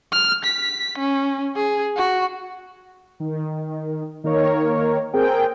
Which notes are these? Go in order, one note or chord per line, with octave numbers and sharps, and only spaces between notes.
F6
B6
C#4
G#4
F#4
D#3
D#3 A#3 A#4 C#5
C4 G#4 A#4 G5